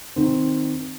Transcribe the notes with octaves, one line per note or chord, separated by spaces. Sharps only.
D#3 C4